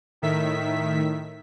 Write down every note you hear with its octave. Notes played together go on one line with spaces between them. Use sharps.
A2 D#3 E5 B6